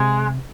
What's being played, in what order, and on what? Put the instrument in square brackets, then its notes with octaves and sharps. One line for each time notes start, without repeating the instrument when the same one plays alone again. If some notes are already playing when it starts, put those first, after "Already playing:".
Already playing: [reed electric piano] C3 [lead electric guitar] G#3